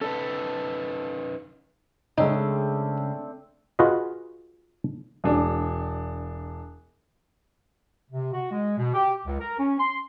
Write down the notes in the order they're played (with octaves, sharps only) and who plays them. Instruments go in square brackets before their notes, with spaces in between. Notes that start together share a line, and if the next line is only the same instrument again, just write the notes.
[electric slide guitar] C#4 D#4 B4 [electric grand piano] A4
[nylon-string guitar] C#3 G#3 [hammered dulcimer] A3 C4 D4 [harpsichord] D#4
[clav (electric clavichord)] F4 F#4 G#4 B4 D#5
[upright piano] E1 D4
[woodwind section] C3
F#4
G#3
B2
G4
C#2
A#4
C#4
C6